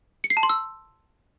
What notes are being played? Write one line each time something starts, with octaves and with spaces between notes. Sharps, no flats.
C#7
C7
A5
C6
E6